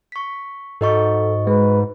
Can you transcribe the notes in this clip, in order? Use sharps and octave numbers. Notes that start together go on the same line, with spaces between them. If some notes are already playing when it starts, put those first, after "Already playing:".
C#6 B6
G#2 F#4 A4 D#5 C#6
G#3 B4